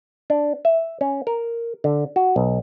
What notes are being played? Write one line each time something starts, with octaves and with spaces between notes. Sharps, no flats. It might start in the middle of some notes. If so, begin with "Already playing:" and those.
D4
E5
C#4
A#4
D3
F#4
B1